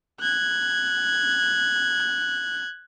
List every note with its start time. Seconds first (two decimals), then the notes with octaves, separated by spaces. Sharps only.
0.21 F#6 G#6